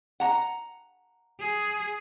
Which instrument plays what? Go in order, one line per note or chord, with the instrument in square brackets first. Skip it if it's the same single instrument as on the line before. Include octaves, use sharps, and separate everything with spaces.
[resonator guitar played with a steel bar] F#5 A#5
[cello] G#4